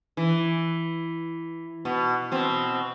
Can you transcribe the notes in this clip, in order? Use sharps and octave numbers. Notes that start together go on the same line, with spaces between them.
E3
B2
B2 C4